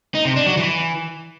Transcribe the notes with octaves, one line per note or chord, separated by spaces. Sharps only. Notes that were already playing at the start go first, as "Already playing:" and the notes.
D#4
C3
D4
F#3
E3